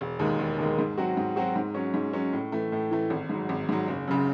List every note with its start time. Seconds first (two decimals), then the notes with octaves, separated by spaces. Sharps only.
0.01 E1
0.19 D#2 D#3 G#3
0.39 E1
0.58 D#2 D#3 G#3
0.78 G#2
0.98 F#3 C4 F#4
1.17 G#2
1.36 F#3 C4 F#4
1.56 G#2
1.75 F#3 C#4
1.94 G#2
2.13 F#3 C#4
2.33 A2
2.52 E3 A3
2.72 A2
2.91 E3 A3
3.10 G#1
3.29 G#2 F#3
3.49 G#1
3.69 G#2 F#3
3.88 F#1
4.08 F#2 C#3